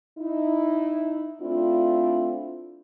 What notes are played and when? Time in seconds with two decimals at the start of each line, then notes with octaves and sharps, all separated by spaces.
0.19 D#4 E4
1.41 A3 C4 D4 E4 F4